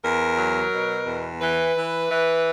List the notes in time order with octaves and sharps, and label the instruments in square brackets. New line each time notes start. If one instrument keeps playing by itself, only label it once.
[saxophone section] E2 A#4
F#3
B2
E2
E3 B4
E3
E3